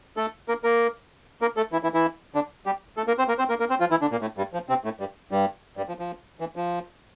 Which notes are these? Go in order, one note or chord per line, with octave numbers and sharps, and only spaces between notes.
A3 A4
A#3 A#4
A#3 A#4
A#3 A#4
A3 A4
E3 E4
E3 E4
E3 E4
D3 D4
G3 G4
A3 A4
A#3 A#4
C4 C5
A#3 A#4
C4 C5
A#3 A#4
A#3 A#4
C4 C5
F3 F4
E3 E4
D3 D4
A#2 A#3
A2 A3
G2 G3
F3
C3 C4
A2 A3
G2 G3
G2 G3
G2 G3
F3
F3
E3
F3